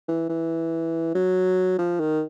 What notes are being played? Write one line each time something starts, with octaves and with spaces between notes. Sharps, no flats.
E3
E3
F#3
F3
D#3